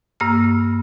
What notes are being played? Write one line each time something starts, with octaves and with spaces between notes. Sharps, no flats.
G2 A#3 E6 F6